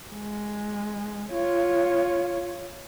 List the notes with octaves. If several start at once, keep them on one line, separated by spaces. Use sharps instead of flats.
G#3
F4 C#5